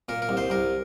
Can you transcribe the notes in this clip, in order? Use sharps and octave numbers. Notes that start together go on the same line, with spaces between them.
A#2 A#4
A#4
C2
C5
C2 A#4